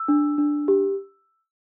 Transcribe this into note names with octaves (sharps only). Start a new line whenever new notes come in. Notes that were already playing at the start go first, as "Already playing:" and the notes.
Already playing: E6
D4
D4
G4